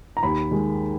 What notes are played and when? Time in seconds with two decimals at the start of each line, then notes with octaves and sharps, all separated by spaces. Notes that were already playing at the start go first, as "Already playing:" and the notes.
0.17 A#5
0.23 D#2 B5
0.51 D#3 G#3